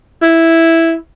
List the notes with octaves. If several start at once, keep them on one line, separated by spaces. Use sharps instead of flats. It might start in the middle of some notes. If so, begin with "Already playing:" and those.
E4